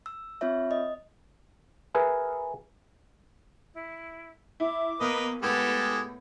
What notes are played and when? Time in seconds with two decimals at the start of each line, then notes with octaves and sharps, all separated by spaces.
0.06 E6
0.41 C4 F4 C#5 E5
0.71 D#5
1.94 G#4 A#4 B4 E5 G#5
3.73 E4
4.60 E4 D6
5.01 E2 A#3 A#4 B4 D#5
5.43 A2 G#3 B3 G4 A4 G#6